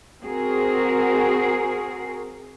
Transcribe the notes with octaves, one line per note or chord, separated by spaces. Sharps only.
C4 F#4 G#4 A#4